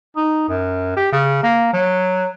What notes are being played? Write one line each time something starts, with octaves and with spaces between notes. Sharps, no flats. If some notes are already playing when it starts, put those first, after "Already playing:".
D#4
F#2
G4
C#3
A#3
F#3